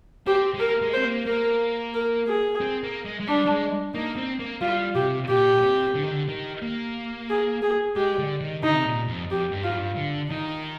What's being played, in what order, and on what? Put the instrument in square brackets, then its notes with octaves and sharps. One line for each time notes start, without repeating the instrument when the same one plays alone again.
[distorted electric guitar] C4 [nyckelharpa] G4
[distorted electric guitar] G#3
[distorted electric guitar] A#3 [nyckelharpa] A#4
[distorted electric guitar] G#3
[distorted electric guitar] C4 [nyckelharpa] C5
[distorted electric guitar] A#3
[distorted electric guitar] A#3 [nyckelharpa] A#4
[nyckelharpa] A#4
G#4
[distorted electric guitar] C4
A#3
G#3
G#3
[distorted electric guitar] G3 [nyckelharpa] D4
[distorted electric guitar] G3
G#3
[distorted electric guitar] A#3 [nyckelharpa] D#4
[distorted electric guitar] C4
A#3
[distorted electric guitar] G3 [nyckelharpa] F4
[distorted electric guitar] C3 [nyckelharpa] G4
[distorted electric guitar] A#2 [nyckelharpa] G4
[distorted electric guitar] C3
D3
D#3
D3
D#3
A#3
[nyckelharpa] G#4
G#4
[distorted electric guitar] G#3 [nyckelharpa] G4
[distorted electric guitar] D3
D#3
[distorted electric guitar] D3 [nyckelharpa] D#4
[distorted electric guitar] C3
A#2
F2
[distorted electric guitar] F2 [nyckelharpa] G4
[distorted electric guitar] G2
[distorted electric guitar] G#2 [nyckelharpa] F4
[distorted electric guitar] G2
D3
[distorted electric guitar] D#3 [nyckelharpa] D#4